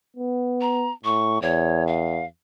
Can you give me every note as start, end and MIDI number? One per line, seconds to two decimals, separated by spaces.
0.17 0.90 59
0.61 0.92 82
1.05 1.37 45
1.05 1.41 85
1.42 2.24 40
1.42 1.86 73
1.87 2.25 77